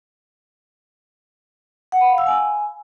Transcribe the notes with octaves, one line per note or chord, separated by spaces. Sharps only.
F#5
B5
F5
E6
G#5